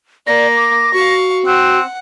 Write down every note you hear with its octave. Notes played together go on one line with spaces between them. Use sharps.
A#3 D5 A#6
D6
F#4 F5 C#6
C4 F#5 F#6